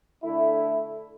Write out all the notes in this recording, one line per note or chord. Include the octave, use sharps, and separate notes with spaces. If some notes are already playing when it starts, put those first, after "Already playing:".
D3 A3 E4